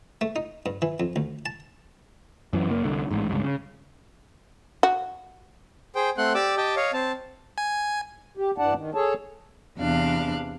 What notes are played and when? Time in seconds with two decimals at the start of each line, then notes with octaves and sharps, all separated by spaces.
0.21 A3
0.36 D#4
0.66 G2
0.82 E3
1.00 F2
1.16 D2
1.46 A5
2.53 F#2 E3
2.69 F#1 A#3
2.84 C2 D3
3.11 A1 G#2
3.29 C#2 G2
3.43 C#3
4.83 F#4
5.95 G#4 C5 G5
6.18 A3 C4 F#5 C6 F#6
6.35 G4 D5 D6 E6
6.57 G4 D#5 G5 A5
6.76 C#5 D#5 F5
6.93 C4 A5
7.58 G#5
8.37 G4
8.58 G2 E3 D4 D5 F#5 A5
8.74 D#3
8.94 G#4 A4 C#5 A5
9.78 E2 C3 D4 F5 F#6